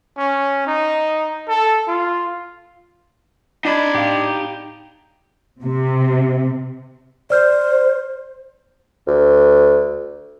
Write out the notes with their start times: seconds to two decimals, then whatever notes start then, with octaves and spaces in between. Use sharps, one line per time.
0.17 C#4
0.67 D#4
1.48 A4
1.87 F4
3.65 D4 D#4 D#5 B5
3.95 A2 G4 F5
5.61 C3
7.30 C5 D5 F6 G6
9.07 D2